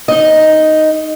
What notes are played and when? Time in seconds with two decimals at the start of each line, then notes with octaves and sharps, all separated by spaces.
0.08 D#4 D#5